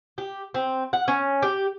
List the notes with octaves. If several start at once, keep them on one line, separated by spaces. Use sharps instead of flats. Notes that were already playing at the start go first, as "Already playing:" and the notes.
G4
C4
F#5
C#4
G4